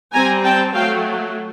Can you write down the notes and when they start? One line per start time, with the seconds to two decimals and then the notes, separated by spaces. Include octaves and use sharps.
0.13 G3 C4 G#5 A#5
0.44 G5 A5
0.74 F#3 A3 F5 G5